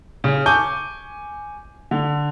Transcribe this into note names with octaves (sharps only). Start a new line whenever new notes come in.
C#3 C#4
G#5 C#6 D6 G6
D3